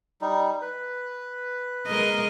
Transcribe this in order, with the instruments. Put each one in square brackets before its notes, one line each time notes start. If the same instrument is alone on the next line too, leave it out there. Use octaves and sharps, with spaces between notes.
[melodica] G3 D#4
B4
[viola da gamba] G#3 A#4 D#5